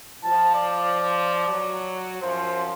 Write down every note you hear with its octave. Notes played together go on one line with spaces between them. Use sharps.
F3 A5
D5
F#3
F#2 F3 C5